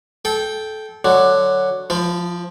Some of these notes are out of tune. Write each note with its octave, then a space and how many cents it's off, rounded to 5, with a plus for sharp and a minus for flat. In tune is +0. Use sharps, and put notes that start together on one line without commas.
A4 -25 G5 +0
D3 +10 F#3 +0
F3 +5 E4 +45